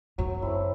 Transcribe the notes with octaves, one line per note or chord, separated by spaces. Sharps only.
F#2 F#3
A3 C4 E4